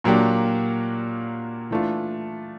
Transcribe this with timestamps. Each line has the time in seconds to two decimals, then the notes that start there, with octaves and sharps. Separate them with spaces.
0.04 A#2 F#3 A#3 D4 G4
1.71 E3 A3 D4 F4